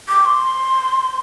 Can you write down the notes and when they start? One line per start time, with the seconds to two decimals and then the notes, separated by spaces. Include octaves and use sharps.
0.09 D6
0.26 C6